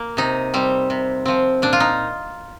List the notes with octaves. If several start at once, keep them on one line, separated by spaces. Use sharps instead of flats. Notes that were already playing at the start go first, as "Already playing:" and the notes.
Already playing: A#3
C3 D#4
G3 C4
C3
F3 C4
A#2 D4
F4
D#4